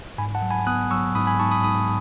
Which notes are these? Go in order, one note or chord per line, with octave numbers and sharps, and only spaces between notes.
G#2 G#5 B5
F#5 A5
F#3
G#5 B5
B3 D#6 F#6
F#3 C#6 E6
G#2 B5 D#6
G#5 B5
G#2 A5 C#6
B5 D#6
G#2 B5 D#6